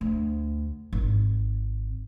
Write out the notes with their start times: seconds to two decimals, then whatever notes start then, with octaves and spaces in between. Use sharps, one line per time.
0.01 D2
0.93 G#1